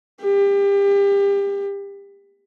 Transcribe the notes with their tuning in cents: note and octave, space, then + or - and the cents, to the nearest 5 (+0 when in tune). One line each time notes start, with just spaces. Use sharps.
G4 +30